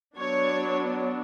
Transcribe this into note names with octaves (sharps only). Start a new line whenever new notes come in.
F#3 B3 D4 C#5